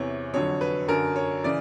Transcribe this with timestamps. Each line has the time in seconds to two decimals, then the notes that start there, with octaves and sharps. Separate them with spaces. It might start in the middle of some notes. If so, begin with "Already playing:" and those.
Already playing: E2 C3 E3 C#5
0.33 F2 D3 F#3 C#5
0.61 B4
0.88 F#2 D3 F#3 A#4
1.16 C#5
1.44 C#3 E3 D5